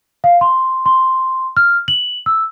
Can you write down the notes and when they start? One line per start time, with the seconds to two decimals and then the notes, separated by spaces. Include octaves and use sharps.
0.24 F5
0.41 C6
0.86 C6
1.57 F6
1.88 F#7
2.26 E6